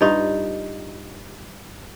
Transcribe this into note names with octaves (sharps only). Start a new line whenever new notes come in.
G2 D#4 F4